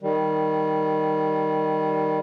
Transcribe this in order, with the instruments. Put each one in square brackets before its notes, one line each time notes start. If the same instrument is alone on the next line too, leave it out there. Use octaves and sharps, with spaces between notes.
[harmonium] D#3 G3